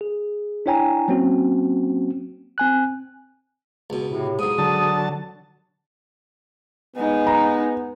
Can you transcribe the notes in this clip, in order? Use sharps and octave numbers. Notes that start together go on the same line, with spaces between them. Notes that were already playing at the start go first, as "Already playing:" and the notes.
G#4
D4 E4 C#5 G5 G#5 A#5
F#3 A#3 C4 C#4 F#4
C4 G#5 F#6
C#2 B2
A2 C3
B1 G#2 D#6
D3 F#3 A5
G#3 B3 D#4
A#5